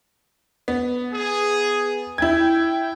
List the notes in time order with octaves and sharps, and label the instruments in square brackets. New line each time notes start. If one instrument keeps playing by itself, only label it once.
[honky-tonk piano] B3
[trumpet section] G#4
[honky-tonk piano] E4 G#6 [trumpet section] G5